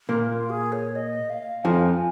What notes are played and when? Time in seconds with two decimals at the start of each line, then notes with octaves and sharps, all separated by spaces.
0.09 A#2 A#3
0.26 F4
0.50 G#4
0.72 C#5
0.96 D#5
1.30 F5
1.64 F2 F3 G#5